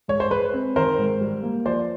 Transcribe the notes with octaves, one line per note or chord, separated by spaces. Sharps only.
G#2 C#5
C5
G#3 B4
C4
D#3 A#4 C5
G#2
G3
A#3
F3 C5 D5